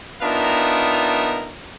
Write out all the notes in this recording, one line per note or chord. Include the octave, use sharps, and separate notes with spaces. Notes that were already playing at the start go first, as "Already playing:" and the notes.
B3 D4 D#4 F4 A#4 E5